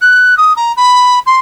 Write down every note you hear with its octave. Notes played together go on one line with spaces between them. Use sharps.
F#6
D#6
A#5
B5
C6